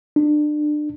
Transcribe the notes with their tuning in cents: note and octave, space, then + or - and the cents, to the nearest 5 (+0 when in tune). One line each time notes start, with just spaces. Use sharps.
D4 +30